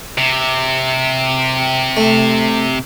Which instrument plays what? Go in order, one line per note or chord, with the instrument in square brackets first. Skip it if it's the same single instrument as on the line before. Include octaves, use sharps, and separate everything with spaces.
[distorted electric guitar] C3
[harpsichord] A3